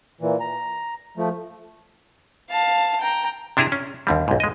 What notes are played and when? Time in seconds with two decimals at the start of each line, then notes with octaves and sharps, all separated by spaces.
0.21 A#2 E3
0.40 A#5
1.17 F3 A3
2.50 F5 A5
3.01 G5 A#5
3.57 C3 D4 E4 G#4 A#5
3.72 C#4
4.07 D#2 D3 G3
4.28 B1 G#2
4.40 G#3 D#5